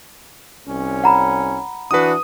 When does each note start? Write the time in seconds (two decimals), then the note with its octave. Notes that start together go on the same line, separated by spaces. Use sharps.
0.67 C2 C#4
1.04 F#5 A#5 B5
1.91 E3 D4 F#4 B4 D#6